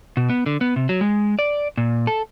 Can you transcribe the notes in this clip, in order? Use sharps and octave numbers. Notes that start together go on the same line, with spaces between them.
B2
B3
D3
B3
C3
F#3
G#3
D5
A#2
A4